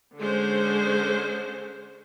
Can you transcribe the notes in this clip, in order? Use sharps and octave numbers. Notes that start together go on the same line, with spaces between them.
D3 G#3 C#4 C5